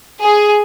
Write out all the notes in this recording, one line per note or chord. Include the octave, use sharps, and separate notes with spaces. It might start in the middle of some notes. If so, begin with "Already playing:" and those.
G#4